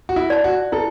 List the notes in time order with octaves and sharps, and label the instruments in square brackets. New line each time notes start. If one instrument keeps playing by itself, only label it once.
[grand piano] F#4
E4
[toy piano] D5 A5
[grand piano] F#4
[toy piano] E4 [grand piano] A4